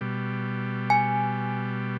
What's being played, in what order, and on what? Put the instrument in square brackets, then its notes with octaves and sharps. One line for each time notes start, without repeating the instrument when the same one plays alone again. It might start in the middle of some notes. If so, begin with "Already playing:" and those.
[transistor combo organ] B2 G3
[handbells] G#5